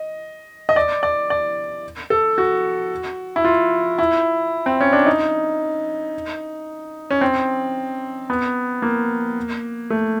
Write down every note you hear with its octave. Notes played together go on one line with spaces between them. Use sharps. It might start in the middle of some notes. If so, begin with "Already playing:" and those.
Already playing: D#5
D#5
D5
D5
D5
A4
F#4
E4
F4
E4
C4
C#4
D4
D#4
C#4
C4
B3
A#3
A3